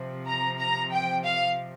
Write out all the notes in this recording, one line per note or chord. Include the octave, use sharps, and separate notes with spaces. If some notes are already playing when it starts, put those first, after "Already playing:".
Already playing: C3 F3
A#5
A#5
G5
F5